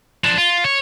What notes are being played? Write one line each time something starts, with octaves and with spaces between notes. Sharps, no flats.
F3 D4
F4
C#5